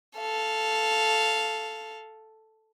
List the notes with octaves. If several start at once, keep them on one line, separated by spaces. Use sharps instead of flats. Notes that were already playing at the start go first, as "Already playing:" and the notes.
A4 F5